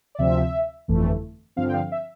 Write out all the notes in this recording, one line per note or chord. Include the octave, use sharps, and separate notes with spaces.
D5
D2 C3 F3 C4 E5
G1 F2 E3 A3
G2 D3 F3 C4 F5
G5
F5
E5